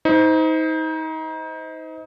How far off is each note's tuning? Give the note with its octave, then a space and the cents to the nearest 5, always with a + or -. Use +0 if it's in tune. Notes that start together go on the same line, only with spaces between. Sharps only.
D#4 +30 C5 -20